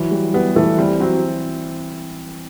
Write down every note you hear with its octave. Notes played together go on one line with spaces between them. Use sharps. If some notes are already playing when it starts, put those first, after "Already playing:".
Already playing: E3 F#3
G3
G3 B3
E3 A3
G3 C4
F#3 C4